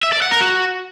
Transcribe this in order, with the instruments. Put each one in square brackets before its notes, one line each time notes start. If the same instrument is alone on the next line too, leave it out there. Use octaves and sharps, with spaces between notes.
[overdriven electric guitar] E5
D5
F#5
A#4
F#4